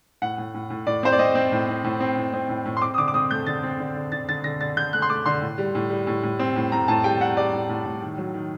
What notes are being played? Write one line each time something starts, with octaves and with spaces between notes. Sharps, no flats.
A2 F#5
A2
A2
A2
A2 D5
C4 C5
D5
C4 D#5
C4
A2
C4
A2
C4
A2
C4
A2
A2
C6
C4 D6
D#6
D3 D6
D6
C4 D#6
A3 G6
D3 A6
C4
D3
D3
D3 A6
D3 A6
D3 A#6
D3 A6
D3 G6
A3 F#6
C6
A3 D6
D3 C6
A2
G3
A2
G3
A2
A2
C4
A2
A2 A#5
A2 A5
G3 G5
G3 F#5
G3 D5
A2
A2
A2
D#3
F#3
D#3